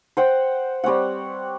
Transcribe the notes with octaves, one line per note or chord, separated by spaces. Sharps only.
C5 F#5 G5
G3 C4 C#5 F#5